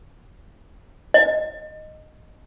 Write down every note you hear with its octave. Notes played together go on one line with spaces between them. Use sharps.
D#5